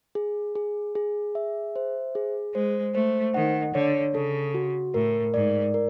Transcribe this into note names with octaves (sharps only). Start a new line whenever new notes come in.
G#4
G#4
G#4
E5
C5
G#4
G#3 C5
A3 C5
D#3 F#5
D3 C#5
C#3 A4
F#4
A2 A#4
G#2 D5
A#4